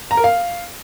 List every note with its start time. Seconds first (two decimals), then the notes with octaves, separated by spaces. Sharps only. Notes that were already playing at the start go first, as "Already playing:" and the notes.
0.11 A#5
0.17 A#4
0.24 F5